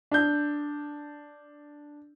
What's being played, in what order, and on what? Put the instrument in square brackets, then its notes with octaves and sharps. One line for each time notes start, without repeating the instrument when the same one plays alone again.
[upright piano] D4 G6